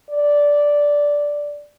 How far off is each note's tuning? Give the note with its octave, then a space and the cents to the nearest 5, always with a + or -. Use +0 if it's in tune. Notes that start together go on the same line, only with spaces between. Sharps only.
D5 -5